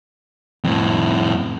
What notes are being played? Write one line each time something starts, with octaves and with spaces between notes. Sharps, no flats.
F2 A2